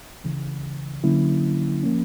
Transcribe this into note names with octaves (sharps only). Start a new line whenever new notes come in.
C#2 C#3 E3
D3 F#3 A#3 C#4 E4
F3 A#3 C#4